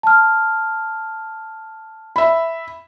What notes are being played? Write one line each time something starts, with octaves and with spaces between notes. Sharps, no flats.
A5 F6
E5 B5